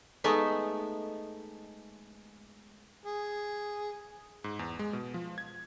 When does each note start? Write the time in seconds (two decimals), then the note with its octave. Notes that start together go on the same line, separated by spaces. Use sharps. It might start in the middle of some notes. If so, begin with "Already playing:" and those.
0.24 G#3 A3 B3 D#4 E5
3.06 G#4
4.44 G#2
4.59 E2
4.79 G#3
4.93 B2
5.14 F3
5.38 G#6